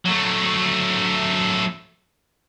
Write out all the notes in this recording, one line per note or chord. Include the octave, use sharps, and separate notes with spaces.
F#3 A3